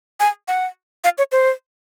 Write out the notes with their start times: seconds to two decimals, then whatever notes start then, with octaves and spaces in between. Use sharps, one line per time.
0.20 G#5
0.48 F#5
1.04 F5
1.18 C#5
1.32 C5